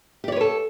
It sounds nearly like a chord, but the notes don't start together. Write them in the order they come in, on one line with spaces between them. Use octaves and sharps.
G4 D5 C#5 B4 A4